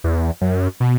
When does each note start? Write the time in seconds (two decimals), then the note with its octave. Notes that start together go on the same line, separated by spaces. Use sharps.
0.04 E2
0.41 F#2
0.80 B2